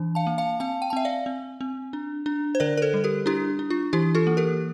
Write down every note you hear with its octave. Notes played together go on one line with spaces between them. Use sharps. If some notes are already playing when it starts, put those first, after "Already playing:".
Already playing: E3 D4
F5 A5
A#3
F5 A5
C4 F5 A5
G5
A5
C4 E5 G5
D5 F5
C4
C4
D4
D4
C5
D3 A#4 D5
A#4
A4 C5
G3
G4 A#4
D4 E4 G4
D4
F4
E3 E4 G4
F4 A4
A#3
G4 A#4